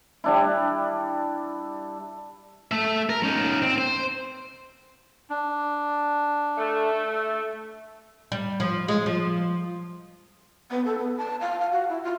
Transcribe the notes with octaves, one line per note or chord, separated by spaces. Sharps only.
G3 D4 E4
A3 E5
A#4
C#4 D#4
C4
C5
D4
A3
G3
F3
G#3
F3
B3
A4
B3
A5
F5
F5
F#4
E4
F4